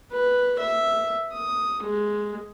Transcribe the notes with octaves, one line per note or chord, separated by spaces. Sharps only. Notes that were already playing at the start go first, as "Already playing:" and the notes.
B4
E5
D#6
G#3